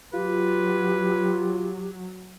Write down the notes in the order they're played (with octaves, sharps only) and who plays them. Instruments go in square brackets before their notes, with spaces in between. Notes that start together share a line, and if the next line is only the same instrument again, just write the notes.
[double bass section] F#3 [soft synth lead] F4 [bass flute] G4 [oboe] B4